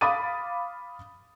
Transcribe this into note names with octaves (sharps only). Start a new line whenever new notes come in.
F5 B5 D6 D#6 A6 D#7